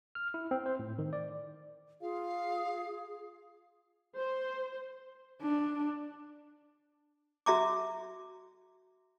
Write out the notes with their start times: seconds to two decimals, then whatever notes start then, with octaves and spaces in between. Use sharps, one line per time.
0.15 F6
0.34 E4
0.51 C4
0.66 C5
0.79 A2
0.99 D#3
1.13 D5
2.01 F4 G#4 F5
4.17 C5
5.42 D4
7.46 F#4 E5 A#5 D6